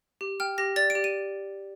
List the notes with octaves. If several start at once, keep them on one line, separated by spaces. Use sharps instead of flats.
G4
G5 F6
G4 A#6
D5 A6
D7
G4
D#7